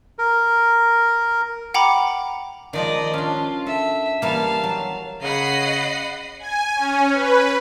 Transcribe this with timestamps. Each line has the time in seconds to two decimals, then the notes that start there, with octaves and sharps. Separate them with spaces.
0.19 A#4
1.74 F#5 G5 A#5 B5 D6
2.73 D#3 F3 G#3 D5 D#5
3.13 C#4 D4 F4
3.66 A4 E5
4.22 E3 G3 A#3 F5 A5
4.63 F#3
5.23 C#3 D#5 F#5 B5 C7
6.40 G#5
6.76 C#4
7.13 B4